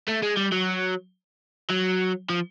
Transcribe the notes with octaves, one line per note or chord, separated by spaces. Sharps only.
A3
G#3
G3
F#3
F#3
F3